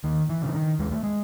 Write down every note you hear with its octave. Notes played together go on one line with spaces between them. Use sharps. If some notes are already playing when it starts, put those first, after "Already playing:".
D#2 D#3
E3
C#3 E3
D#3
D#2 G#3
A3
G#3